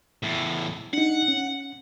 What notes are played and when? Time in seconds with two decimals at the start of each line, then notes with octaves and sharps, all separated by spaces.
0.23 E2 A2
0.93 D4 D#4 F#5
1.28 C#4